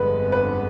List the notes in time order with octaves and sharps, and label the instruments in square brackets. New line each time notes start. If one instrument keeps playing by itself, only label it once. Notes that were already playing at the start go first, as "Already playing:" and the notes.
Already playing: [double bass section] G1 F2 D3 G#3 B3 [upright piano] B4
[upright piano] B4